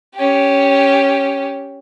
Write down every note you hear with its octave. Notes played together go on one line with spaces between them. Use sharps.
C#4 G4